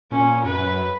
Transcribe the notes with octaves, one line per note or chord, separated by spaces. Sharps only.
A#2 C#4
F#2 B4